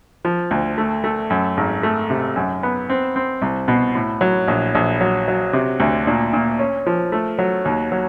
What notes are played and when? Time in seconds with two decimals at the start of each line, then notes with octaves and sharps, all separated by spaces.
0.25 F3
0.51 D2
0.78 A3
1.04 A3
1.30 F#2
1.57 G#1
1.83 A3
2.10 C3
2.36 F#2
2.63 B3
2.90 C4
3.16 C4
3.42 C2
3.68 B2
3.95 A2
4.21 F#3
4.48 A#1
4.75 A#1
5.01 F#3
5.28 F#3
5.53 C3
5.80 D2
6.07 A#2
6.33 A#2
6.59 C#4
6.86 F3
7.12 A3
7.39 F#3
7.65 D#2
7.92 F#3